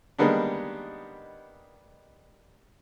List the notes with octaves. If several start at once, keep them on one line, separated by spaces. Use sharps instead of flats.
D#3 G3 G#3 A#3 B3 D4